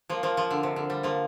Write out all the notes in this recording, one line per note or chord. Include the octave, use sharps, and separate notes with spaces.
F3 A#3
F3 A#3
F3
D3
C3
D3
G3
F3 A#3